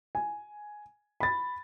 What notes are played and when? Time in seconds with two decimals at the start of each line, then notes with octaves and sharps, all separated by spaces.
0.15 G#5
1.20 B5 A6